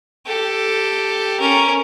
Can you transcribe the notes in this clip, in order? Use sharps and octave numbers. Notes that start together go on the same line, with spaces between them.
G4 A4
C#4 A#4